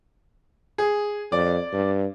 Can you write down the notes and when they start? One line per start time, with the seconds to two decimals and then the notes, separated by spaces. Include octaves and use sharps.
0.78 G#4
1.32 F2 D5
1.73 G2